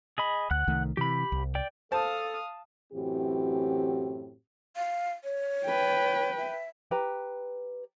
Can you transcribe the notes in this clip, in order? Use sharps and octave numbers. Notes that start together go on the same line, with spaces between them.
G#4 D#5 B5
D2 F#5 F#6
C2 D#3 A3
C3 E3 G4 B5
C2
D5 G5
A4 C5 F5 A5 D#6 F6
F#2 A2 E3 C4 F#4 G4
F5
C#5
B4 G5
E5
G4 B4 A#5